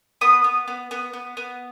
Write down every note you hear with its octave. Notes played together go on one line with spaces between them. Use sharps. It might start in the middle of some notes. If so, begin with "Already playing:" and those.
B3 D#6
B3
B3
B3
B3
B3